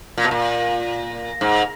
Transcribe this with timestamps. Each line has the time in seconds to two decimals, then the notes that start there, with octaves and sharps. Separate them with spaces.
0.18 A#2
0.24 B2
0.31 A#2
1.41 G#2